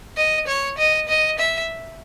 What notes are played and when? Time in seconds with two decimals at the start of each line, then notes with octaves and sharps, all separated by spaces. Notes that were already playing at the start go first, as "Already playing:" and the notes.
0.17 D#5
0.47 C#5
0.78 D#5
1.09 D#5
1.39 E5